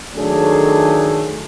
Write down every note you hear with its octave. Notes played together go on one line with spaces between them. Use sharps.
D#3 F#3 A3 D4 G#4 A4